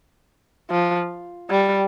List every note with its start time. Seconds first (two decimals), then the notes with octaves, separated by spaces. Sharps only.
0.70 F3
1.50 G3